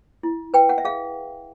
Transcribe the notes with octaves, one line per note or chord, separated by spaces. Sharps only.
E4
B4 G5
F#5
E5
G#4 F5